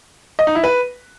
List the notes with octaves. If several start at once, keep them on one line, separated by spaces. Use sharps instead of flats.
D#5
D#4
E4
B4